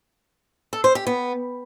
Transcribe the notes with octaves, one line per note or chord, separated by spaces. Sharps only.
A4
C5
G4
B3